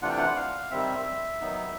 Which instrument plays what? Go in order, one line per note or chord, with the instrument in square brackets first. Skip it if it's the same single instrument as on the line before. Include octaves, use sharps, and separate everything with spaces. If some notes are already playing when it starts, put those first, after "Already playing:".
[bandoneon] C3 E3 A3 D4 F4 F#5
G5
F#5
F5
C3 D#3 G3 C4 E5
D#3 F#3 B3 D#4